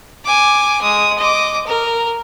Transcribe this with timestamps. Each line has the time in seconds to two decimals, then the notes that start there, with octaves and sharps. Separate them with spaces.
0.25 G#5 D6
0.82 G#3 D#6
1.18 D#5 D6
1.66 A#4